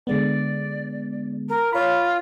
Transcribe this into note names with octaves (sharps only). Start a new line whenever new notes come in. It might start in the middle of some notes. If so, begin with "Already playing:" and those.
D3 G#3 B3 D5
A#4
F4 C#5 B5